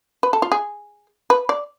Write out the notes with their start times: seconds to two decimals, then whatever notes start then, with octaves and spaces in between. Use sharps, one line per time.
0.23 B4
0.33 A4
0.42 F4
0.52 G#4
1.30 B4
1.49 D5